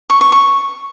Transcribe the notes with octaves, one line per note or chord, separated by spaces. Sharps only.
C#6
C#6
C#6